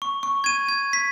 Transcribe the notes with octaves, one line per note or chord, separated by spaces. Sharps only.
C#6
C#6
G#6 D#7
G#6
B6